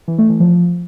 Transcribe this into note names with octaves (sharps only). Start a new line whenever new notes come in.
E3
A3
E3
F3